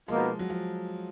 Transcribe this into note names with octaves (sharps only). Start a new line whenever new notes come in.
B2 F3 G#3 A#3 D#4
F#3
F3